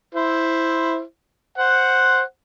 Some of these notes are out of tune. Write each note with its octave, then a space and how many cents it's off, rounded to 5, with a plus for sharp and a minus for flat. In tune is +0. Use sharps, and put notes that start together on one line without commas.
E4 +0 C5 +0
C5 +0 F#5 +0